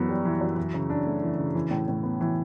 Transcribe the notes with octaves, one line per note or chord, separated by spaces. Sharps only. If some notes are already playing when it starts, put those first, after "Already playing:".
Already playing: F#2 E3 B3
G3
E3
F#2
E3
C#3
D4
A3
E3
C#3
E3
A2
A2
B3
E3